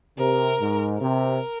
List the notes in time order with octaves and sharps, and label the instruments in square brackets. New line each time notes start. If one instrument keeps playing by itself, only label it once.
[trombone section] C3 [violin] A#4
[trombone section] G#2
[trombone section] C3 [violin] A#4